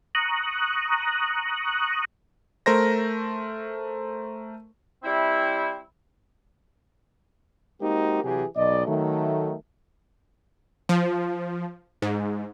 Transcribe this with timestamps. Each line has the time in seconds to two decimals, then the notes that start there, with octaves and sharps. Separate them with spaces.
0.15 A#5 C#6 D#6 F#6
2.66 A3 A#4 C5 A#6
5.04 G3 C4 E4
7.82 G#3 A#3 C4 D#4 F#4 G4
8.24 C3 E3 F#3 G4 G#4
8.56 B1 D5 D#5
8.87 D#3 F#3 A3
10.89 F3
12.02 G#2